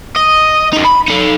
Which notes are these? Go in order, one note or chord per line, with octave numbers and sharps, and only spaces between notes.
D#5
F#2 D#4
B5
D#4 A4